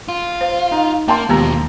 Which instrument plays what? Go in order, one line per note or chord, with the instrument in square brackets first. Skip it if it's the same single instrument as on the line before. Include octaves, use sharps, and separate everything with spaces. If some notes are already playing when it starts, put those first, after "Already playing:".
[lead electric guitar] F4
[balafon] C5 F5
[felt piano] D#4
[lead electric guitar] A#3 [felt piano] G5 A5 C6
[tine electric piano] D#2 A#5 [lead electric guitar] B2 F3 [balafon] G#3 B3 G4